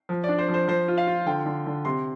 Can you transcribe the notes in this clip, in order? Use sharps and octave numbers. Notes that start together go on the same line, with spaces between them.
F3
D4 D5
C5
F3
C5
F3 C5
F4
F5
F4
D3 G5
D3
D3
C3 C6